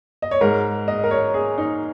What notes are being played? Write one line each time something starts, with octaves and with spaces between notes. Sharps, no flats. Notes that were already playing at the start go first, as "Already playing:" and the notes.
D#5
C#5
G#2 G#3 A#4
D#5
A#4
C#5
G#4
D#4